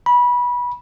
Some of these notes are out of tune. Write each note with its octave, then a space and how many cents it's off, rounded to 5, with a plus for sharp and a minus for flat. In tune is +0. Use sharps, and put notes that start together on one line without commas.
B5 -20